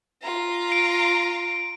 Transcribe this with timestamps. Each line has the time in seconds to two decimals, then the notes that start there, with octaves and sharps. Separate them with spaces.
0.22 F4 A#5
0.72 D7